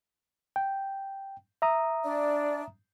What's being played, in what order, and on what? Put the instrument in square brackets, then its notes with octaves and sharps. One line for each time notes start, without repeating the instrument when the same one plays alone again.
[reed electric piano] G5
E5 A#5 D#6
[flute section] D4 D5